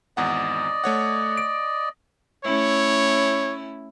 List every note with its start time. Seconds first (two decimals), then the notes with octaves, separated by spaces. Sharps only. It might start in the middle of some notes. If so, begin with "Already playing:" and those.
0.17 G#1 E2 D5 D#5 F#5
0.84 A3 C#5 F#5
1.37 D7
2.44 A3 C#4 E4 C#5